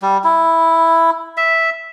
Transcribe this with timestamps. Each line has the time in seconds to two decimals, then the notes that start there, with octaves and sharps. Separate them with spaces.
0.02 G3
0.24 E4
1.37 E5